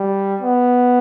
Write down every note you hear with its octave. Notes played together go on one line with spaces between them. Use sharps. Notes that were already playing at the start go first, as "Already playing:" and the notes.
Already playing: G3
B3